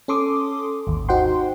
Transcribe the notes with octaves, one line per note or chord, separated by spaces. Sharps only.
C#4 A4 C6 D6 D#6
G#1 D#2
D#4 F#4 C5 F#5 G5 C6